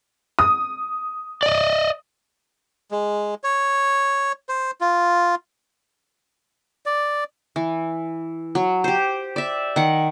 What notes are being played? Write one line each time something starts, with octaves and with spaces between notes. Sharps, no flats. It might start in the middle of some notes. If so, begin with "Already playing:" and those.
D#6
D5 D#5
G#3
C#5
C5
F4
D5
E3
F#3
G4 C5
D5 E5
D#3 F#5